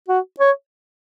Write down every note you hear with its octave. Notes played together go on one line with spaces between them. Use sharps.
F#4
C#5